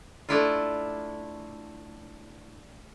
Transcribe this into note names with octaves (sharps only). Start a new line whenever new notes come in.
A3 D4 E4 F4